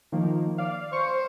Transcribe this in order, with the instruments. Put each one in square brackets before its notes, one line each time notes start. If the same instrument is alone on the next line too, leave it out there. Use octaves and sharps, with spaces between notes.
[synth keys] D#3 F3 A#3
D5 F5
[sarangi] C5 [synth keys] C#6